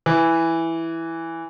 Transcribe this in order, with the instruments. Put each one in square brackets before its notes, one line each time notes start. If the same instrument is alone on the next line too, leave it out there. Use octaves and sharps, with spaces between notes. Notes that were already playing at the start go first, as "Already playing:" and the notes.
[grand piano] E3